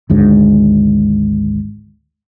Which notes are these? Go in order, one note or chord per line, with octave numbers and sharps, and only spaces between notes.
G#1 D2 G#2